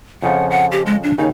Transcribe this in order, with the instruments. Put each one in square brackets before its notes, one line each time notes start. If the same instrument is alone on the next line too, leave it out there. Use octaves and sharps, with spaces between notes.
[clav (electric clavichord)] F2 C#3 F3 [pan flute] F#5
[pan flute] F#5
G4
G#3
D4
[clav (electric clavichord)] D#2 C#3 [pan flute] D#4